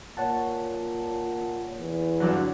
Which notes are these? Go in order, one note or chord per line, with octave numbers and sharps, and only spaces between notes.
A#2 C#5 F#5 A5
E2
G2 D3 F#3